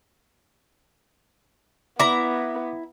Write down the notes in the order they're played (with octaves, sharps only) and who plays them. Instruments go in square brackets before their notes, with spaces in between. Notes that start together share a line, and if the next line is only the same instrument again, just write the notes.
[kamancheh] B3 [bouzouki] E4 A#5 [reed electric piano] D6